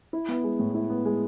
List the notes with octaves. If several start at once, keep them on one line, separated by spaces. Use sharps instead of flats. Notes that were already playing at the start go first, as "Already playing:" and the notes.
E4
B3
G#3
A2
E4
B3
G#3